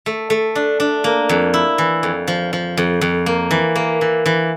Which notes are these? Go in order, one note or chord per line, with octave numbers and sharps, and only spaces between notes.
A3
A3
D4
D4
A#3
F2
E4
E3
F2
F3
F3
F2
F2
A#3
E3
A#3
E3
E3